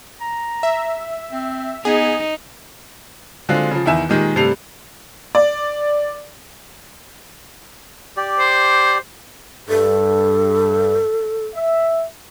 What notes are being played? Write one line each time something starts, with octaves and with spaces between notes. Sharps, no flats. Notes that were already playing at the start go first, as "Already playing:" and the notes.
A#5
E5
C4
B3 D#4 G#4
D3 F#3 G#3 C4 F4
C#3 F3
E2 D#3 E4 E5 G#5 E7
A#2 D#3 G#3 G4
G2 C3 G3 A3 C7 F7
D5
G4 D5
C5
G2 A4
E5